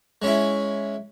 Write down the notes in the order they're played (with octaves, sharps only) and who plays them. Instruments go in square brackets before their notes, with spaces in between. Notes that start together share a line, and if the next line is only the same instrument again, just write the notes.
[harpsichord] G#3 C#4 E4